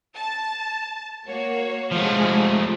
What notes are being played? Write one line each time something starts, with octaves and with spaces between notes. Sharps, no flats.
A5
A#3 F#4 C#5
F3 G#3 A3 G#4